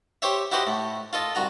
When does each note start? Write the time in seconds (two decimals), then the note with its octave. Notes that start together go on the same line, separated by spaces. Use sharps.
0.22 G4 C5 C#5 E5
0.52 E4 F#4 G4 C5 D#5 F#5
0.67 A2
1.13 F4 A4 D#5
1.35 C2 F#4 A#5